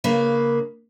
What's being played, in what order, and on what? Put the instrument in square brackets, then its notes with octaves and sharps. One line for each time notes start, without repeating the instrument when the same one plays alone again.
[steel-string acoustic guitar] C#3 A#3 B4